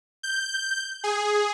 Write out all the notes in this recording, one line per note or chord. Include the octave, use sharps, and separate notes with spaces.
G6
G#4